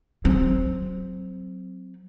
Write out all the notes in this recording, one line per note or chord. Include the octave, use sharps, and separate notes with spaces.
F#3 C4